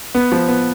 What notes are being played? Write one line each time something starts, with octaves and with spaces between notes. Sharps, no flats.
B3
F3
B3